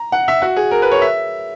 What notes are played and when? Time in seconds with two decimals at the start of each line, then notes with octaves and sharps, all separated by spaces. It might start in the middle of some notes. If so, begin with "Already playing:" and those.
Already playing: A#5
0.12 F#5
0.28 E5
0.42 F#4
0.56 G#4
0.71 A#4
0.82 B4
0.92 C#5
1.02 E5